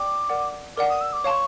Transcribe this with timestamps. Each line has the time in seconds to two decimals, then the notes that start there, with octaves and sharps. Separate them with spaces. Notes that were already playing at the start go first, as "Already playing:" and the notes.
Already playing: D5 G5 D6
0.29 A#4 D5 F#5
0.77 A#4 D5 F#5 D6
0.89 D#6
1.01 E6
1.13 D6
1.24 C#5 F5 A5 C6 C#6